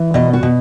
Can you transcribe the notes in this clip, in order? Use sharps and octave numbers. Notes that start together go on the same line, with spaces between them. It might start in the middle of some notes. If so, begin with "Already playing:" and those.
Already playing: E3
B2 D#5
F#4
B2